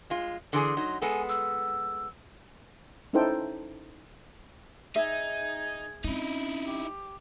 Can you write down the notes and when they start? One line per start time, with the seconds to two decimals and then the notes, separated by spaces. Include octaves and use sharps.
0.10 G#3 F4
0.53 D3 E3 G#4 C6
0.77 F#3 D#4
1.02 G#3 B3 A4 G#5
1.29 E6
3.13 C#4 D#4 E4 A4 C5 G5
4.96 D#4 G#4 E5
6.04 C4 C#4 D#4 E4
6.64 G4